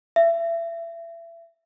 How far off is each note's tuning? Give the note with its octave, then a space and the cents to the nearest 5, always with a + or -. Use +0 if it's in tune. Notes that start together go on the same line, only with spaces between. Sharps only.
E5 +30